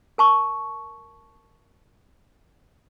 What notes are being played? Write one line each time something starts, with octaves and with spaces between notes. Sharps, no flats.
A#4 A5 C#6